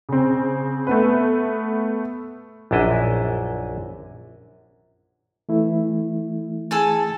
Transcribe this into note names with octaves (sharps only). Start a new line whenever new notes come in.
C#3 C4
A3 B3 B4
A#1 F#2 D4 E4 D#5
E3 A3 E4
G#4 A4 A5